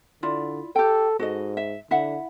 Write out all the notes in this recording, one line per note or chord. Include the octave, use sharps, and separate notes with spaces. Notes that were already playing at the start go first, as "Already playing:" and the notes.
D3 E4 F4 D5
G4 A4 G5
G#2 F#4 A4 D#5
E5
D3 E4 E5 F#5